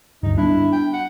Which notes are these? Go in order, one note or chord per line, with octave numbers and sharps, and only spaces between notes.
D2 G2 D#4
G3 B3 D4 E4
G5
F#5